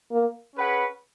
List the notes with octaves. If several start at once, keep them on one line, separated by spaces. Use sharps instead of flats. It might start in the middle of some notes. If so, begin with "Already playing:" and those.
A#3
C#4 G#4 B4 F#5